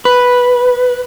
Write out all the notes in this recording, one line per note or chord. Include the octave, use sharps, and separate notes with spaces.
B4